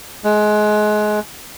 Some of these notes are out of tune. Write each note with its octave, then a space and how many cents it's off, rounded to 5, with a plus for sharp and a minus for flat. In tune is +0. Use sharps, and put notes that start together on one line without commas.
G#3 +25